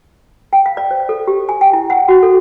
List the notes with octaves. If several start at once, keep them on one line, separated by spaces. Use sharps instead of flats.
G5
F5
D5
C5
A4
G4
G#5
G5
E4
F#5
F#4
A4